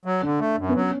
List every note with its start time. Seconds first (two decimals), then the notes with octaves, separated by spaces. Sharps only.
0.05 F#3
0.23 D3 D4
0.40 A3
0.57 F#2
0.69 B3
0.75 F#3 C#4